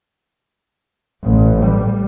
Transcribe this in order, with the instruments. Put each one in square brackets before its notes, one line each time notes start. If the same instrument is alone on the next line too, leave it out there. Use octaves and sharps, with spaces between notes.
[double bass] A1
G3